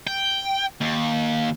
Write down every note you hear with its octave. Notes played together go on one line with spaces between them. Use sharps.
G5
D#2